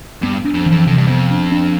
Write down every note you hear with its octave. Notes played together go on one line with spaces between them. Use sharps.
G2 B3
D4
F2
F2 E3
F2 C3
G2
F2 B3
D4
D4